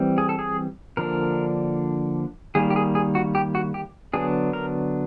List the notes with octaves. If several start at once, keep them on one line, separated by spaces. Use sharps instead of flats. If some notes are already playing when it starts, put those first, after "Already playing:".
Already playing: E3 G3 C4
G#4
A4
G#4
D3 F3 A#3 D4 A#4
D#3 G3 A#3 G#4
G4
G#4
G#4
F#4
G4
F#4
G4
D3 F#3 B3 D4 G#4
A#4